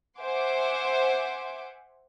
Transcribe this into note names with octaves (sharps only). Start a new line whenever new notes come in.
C5 E5 F#5 G#5 C6 D6